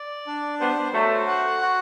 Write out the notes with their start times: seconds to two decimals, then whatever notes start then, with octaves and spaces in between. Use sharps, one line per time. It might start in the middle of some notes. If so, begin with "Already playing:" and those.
Already playing: D5
0.27 D4
0.60 G3 B3 C5
0.94 F#3 A3 F#4
1.28 F#5
1.61 F#4